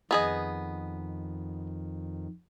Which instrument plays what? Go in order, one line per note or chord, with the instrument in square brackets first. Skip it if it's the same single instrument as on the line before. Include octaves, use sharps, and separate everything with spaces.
[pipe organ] F2 D#3 [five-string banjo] B3 G#4 D#5